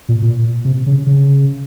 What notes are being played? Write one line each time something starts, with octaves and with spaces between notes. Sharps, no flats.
A#2
A#2
C3
C#3
C#3